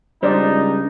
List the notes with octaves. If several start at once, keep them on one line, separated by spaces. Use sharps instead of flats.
C#2 G3 D4 D#4 C5 D5